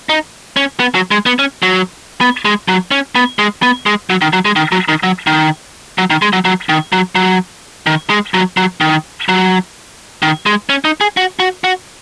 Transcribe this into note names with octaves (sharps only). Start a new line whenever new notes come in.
D#4
C#4
B3
F#3
G#3
B3
C#4
F#3
B3
G#3
F#3
C#4
B3
G#3
B3
G#3
F#3
D#3
F#3
G#3
D#3
F#3
D#3
F#3
D#3
F#3
D#3
G#3
F#3
F#3
D#3
F#3
F#3
D#3
G#3
F#3
F#3
D#3
F#3
D#3
G#3
C#4
D#4
G#4
F#4
F#4
F#4